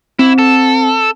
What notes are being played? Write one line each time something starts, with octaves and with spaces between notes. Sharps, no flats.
C4 E4
A4